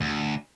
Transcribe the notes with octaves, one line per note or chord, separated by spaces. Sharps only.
D2